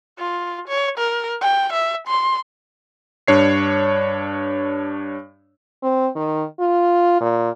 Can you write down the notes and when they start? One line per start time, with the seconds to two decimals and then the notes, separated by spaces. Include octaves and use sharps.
0.18 F4
0.68 C#5
0.98 A#4
1.41 G5
1.73 E5
2.07 C6
3.28 G2 D4 C#5 C7
5.83 C4
6.16 D#3
6.60 F4
7.20 A#2